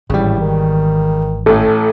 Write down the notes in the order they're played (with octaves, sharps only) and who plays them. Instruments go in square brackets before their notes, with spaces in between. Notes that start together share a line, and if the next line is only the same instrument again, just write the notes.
[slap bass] G#1 E3 [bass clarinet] A2 [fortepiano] C#3 G3
[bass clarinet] D#3
[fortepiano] A1 A2 [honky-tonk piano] A4